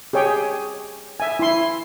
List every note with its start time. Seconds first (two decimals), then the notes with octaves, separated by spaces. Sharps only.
0.13 G4 G#4 C#5 G5
1.20 E5 G#5
1.39 E4 C6